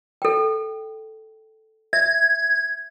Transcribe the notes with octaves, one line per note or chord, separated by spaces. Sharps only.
A4 G5
E5 G#6